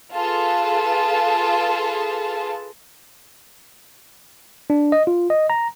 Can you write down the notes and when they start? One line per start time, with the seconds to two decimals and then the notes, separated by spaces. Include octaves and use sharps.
0.12 F4 G#4 A4 B4 A5
4.70 D4
4.92 D#5
5.07 F4
5.30 D#5
5.50 A#5